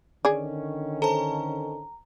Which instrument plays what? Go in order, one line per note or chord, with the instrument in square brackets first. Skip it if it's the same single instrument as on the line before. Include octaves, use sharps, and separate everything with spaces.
[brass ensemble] D3 D#3 C#4 [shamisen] G#4 D5
[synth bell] A4 C5 A5 [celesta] A#5